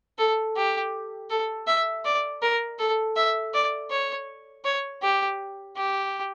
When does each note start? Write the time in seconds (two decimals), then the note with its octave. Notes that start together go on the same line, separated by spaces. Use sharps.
0.18 A4
0.56 G4
1.30 A4
1.67 E5
2.05 D5
2.42 A#4
2.79 A4
3.16 E5
3.54 D5
3.91 C#5
4.65 C#5
5.02 G4
5.76 G4